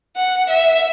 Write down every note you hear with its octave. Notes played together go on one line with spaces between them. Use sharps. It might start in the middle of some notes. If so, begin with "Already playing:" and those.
F#5
E5